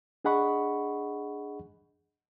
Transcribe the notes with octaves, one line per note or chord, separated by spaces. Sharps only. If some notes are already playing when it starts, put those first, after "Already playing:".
D4 G#4 D#5 F#5 B5 C#6